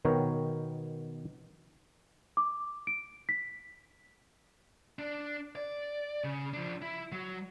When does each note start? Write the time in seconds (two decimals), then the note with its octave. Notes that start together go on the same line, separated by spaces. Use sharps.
0.05 B2 D#3 B3 A#4 C#5 G5
2.37 D6
2.87 D7
3.29 B6
4.99 D4
5.55 D5
6.24 C#3
6.54 F3 D4
6.82 E4
7.12 F#3